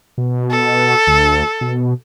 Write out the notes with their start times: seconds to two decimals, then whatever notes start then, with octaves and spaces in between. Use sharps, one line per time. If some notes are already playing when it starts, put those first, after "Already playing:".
0.18 B2
0.51 A4
1.07 D2
1.61 B2